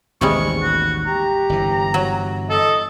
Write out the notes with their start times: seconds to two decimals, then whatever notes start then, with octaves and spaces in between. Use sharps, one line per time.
0.21 A1 D#2 C3 G3 G#3 C#6
0.62 F#4
1.06 G4 A#5
1.49 G1 E3
1.94 F#3
2.50 A4 D#5